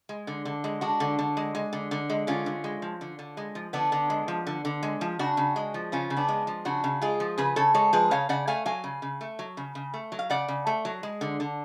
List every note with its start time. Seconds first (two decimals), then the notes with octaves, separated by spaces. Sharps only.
0.09 G#3
0.27 D3
0.45 D3
0.64 G#3
0.81 G#3 D4 F#4
1.00 D3
1.19 D3
1.37 G#3
1.55 G#3
1.73 D3
1.91 D3
2.10 G#3
2.27 D3 C#4 F4
2.46 D3
2.64 G#3
2.82 F3
3.01 D3
3.19 D3
3.37 G#3
3.55 F3
3.73 D3 B3 D4
3.92 D3
4.10 G#3
4.28 F3
4.47 D3
4.65 D3
4.83 G#3
5.01 F3
5.19 C#3 D4 F#4
5.37 C#3
5.56 G#3
5.74 F3
5.92 C#3 C#4 F4
6.10 C#3
6.16 B3 D4
6.28 G#3
6.47 F3
6.65 C#3 D4 F#4
6.84 C#3
7.01 G#3 F4 G#4
7.20 F3
7.38 C#3 G#4 B4
7.56 C#3 A4 C#5
7.74 G#3 A4 C#5
7.93 F3 G#4 B4
8.11 C#3 C#5 F5
8.29 C#3 D5 F#5
8.47 A3 F5 G#5
8.66 F#3 F5 G#5
8.84 C#3
9.02 C#3
9.21 A3
9.39 F#3
9.57 C#3
9.75 C#3
9.94 A3
10.12 F#3
10.19 F5
10.30 C#3 D5 F#5
10.48 C#3
10.67 A3
10.85 F#3
11.03 G#3
11.21 D3
11.40 D3